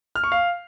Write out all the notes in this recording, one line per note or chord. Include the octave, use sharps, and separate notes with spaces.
F6
C#6
F5